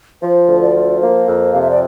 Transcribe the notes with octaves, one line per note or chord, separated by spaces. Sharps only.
F3 C5
D2
D5
F3
A#3 C5
F2
C3 F5
E5
D5